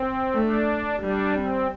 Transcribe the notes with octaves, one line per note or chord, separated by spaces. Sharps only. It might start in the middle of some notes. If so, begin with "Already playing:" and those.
Already playing: C4
A3 D4
G3 D4
C4